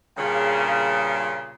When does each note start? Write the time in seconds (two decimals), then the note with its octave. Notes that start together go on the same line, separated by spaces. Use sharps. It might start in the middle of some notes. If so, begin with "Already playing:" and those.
0.17 G2 A#2 C#3